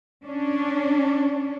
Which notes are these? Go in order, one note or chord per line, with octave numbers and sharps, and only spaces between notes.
C#4 D4